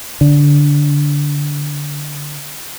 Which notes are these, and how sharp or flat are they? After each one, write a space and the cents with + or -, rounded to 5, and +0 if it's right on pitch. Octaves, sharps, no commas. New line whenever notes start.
D3 -10